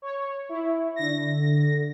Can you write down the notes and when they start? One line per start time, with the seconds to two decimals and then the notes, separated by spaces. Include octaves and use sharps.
0.02 C#5
0.49 E4
0.96 D3 A#6